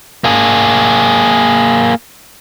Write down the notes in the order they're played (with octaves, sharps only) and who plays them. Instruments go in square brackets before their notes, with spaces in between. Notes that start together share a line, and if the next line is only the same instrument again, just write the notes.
[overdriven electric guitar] A#3 G#4